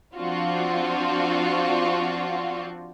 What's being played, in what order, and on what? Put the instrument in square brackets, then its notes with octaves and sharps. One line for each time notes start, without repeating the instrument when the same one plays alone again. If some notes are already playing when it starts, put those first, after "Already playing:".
[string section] F3 C4 D4 F4 F#4